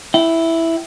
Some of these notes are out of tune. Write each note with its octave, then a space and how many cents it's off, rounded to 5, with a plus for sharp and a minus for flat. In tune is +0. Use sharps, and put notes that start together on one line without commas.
E4 +0 G5 -30